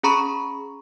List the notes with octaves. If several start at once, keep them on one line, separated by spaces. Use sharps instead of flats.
C#4 G#4 A#5 B5 C#6